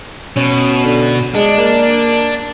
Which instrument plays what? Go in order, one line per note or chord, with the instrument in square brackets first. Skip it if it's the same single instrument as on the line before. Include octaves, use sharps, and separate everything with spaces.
[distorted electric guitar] B2 [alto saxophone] C#4
[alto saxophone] D3
[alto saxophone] G#3 [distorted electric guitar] D4
[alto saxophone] A#3